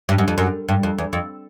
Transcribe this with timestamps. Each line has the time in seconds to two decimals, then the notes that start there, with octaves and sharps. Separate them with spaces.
0.09 G2
0.18 F#2
0.28 F2
0.38 F#2
0.69 G2
0.83 F2
0.98 E2
1.13 F2